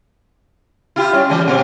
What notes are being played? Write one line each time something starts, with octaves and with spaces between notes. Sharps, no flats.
E4 F4 G4
G3 C#4
E3 G#3
A#2 C4